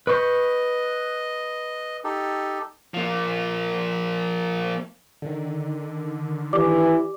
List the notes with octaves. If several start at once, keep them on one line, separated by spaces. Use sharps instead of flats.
B4 D#5 C#6 G6
D#4 G4 A4
F3 A#3
D3 D#3
E3 G4 D5 D6